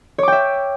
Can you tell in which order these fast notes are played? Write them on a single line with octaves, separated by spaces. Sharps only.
C#5 D6 G5 E5